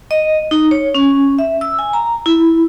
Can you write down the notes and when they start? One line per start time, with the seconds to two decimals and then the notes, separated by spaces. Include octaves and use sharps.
0.11 D#5
0.51 D#4
0.71 C#5
0.95 C#4
1.39 E5
1.61 E6
1.79 G#5
1.93 A#5
2.26 E4